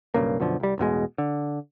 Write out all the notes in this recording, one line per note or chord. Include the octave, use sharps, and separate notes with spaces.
B1 G2 C#3 A#3
F#2 B2 D3 F3
C2 G3
A1 E2 B2 G#3
D3